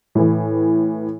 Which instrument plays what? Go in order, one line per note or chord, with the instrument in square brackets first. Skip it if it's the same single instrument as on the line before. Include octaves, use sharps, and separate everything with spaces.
[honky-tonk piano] A2 E3